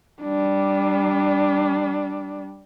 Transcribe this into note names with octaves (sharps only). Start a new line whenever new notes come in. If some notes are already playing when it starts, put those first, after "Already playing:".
G3 D4